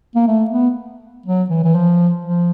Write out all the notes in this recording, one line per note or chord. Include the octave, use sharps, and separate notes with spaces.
A#3
A3
B3
F#3
E3
E3
F3
F3